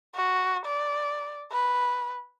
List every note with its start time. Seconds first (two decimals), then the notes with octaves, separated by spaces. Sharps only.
0.15 F#4
0.66 D5
1.52 B4